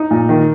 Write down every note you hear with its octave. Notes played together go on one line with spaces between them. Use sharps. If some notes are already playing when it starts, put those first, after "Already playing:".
Already playing: D#4
A#2
D#3